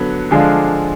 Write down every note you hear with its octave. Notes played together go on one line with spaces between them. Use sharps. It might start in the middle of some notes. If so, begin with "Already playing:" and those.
Already playing: D3 F#3 B3
D3 F3 G#3 D4 F4